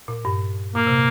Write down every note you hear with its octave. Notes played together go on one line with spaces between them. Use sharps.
A#2
G2
A#2 A#3
C3